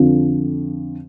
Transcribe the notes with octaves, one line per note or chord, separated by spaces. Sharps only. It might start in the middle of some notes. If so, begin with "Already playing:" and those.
Already playing: F2 D3 F3